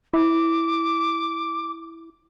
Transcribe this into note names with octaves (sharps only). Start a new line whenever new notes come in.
E4 D6